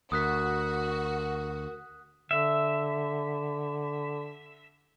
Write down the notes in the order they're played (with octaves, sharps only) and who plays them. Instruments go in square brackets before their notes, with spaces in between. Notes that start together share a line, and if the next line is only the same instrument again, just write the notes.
[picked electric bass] D2 [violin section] F#4 [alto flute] A#4 [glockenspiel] D#6 F#6 B6
[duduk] D3 [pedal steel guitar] E5